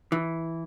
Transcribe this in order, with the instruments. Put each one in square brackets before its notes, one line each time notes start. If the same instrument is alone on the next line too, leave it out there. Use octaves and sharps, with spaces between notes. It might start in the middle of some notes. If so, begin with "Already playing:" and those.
[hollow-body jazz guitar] E3